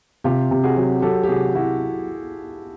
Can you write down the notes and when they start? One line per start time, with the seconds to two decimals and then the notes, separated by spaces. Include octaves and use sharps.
0.24 C3 F4 G4
0.51 C3
0.63 F#4 G#4
0.77 F#3
1.02 F#3 G4 A4
1.23 G4
1.28 C3 F#4 G#4
1.55 F#3 E4 F#4